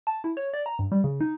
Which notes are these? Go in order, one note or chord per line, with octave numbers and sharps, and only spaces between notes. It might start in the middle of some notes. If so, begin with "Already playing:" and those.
A5
E4
C#5
D5
A#5
G2
G3
C#3
D#4